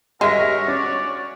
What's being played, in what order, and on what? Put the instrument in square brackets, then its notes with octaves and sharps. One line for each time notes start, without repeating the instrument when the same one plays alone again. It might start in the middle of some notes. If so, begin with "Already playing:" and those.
[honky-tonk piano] G2 E5 A#6 [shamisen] G#3 [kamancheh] F#4 C#5 [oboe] A#4
[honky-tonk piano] C#4 [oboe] D5